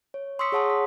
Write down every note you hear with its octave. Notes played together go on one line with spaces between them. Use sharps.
C#5
C6 C#6 D#6 E6 B6 C#7
G#4 C#5 F#5 A5 C6 D#6
B6